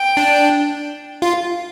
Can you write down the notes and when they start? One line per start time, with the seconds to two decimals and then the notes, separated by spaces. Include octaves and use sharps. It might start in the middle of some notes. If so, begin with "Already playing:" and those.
Already playing: G5
0.17 D4
1.22 F4